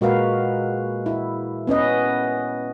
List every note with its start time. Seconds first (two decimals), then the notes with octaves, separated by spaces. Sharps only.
0.01 A#2 G#3 F#4 A#4 B4 F5
1.06 E4
1.67 B3 C#4 B4 D#5